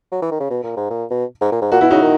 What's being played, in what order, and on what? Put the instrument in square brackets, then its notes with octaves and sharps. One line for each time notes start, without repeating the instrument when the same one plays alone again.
[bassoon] F#3
E3
D#3
C#3
B2
A#2
G#2
A#2
B2
G#2
A#2
G#2
[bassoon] A#2 [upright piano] F#4
[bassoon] B2 [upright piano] E4
[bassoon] C#3 [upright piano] D#4 F#4
[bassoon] D#3